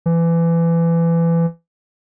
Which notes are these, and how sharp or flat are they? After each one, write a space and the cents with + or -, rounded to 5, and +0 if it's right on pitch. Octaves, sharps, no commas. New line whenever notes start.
E3 +25